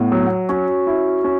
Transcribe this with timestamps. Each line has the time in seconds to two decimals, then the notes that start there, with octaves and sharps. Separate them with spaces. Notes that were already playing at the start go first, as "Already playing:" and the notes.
Already playing: A2 B3
0.12 F#3
0.49 C#4 F#4
0.87 E4
1.24 C#4